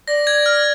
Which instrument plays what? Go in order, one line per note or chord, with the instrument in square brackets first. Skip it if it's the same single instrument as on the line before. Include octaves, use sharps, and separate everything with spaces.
[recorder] D5 [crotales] A#6
[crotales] G#6
F6